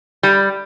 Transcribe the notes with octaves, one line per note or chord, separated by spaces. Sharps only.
G3